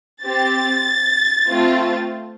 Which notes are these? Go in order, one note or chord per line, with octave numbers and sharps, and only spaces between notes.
C4 G4 A6
A3 C4 F4